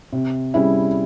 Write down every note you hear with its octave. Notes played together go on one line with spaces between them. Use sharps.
C3
G3 C#4 E4 G#4